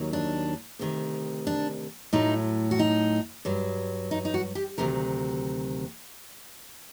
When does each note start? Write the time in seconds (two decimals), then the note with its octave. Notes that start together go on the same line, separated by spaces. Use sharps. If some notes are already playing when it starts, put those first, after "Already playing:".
Already playing: D#2 D#3 F#3
0.13 D4
0.79 D2 C3 D#3
1.47 D4
2.13 A2 F#3 D#4
2.71 F#4
2.79 D#4
3.45 G2 F#3
4.11 D#4
4.25 D#4
4.34 F#4
4.55 G4
4.78 D2 C3 D#3 F#3 A#4